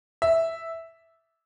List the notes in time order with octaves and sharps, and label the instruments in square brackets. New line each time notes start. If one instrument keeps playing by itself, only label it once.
[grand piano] E5